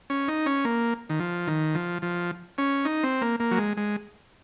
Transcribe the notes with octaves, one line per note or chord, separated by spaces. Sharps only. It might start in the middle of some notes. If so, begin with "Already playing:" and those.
C#4
D#4
C#4
A#3
D#3
F3
D#3
F3
F3
C#4
D#4
C4
A#3
A#3
F#3
G#3
G#3